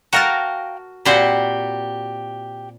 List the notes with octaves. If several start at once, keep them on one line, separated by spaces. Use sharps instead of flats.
F#4 A#4 F5 G5 A5 A#5
A#2 C4 F#4 G4 C5 B5